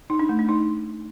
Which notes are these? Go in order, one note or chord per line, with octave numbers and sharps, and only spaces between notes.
D#4
D4
A3
D4
D#4